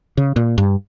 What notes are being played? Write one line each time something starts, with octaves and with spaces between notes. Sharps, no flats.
C#3
A#2
G2